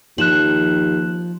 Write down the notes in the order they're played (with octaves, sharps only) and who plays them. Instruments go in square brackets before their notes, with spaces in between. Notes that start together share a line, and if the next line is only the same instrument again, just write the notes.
[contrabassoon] D#2 [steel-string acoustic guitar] F3 [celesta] F#6 E7 F#7